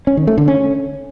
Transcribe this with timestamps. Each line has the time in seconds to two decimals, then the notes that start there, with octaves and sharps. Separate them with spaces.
0.07 C#4
0.17 D#3
0.27 A3
0.38 D3
0.48 C#4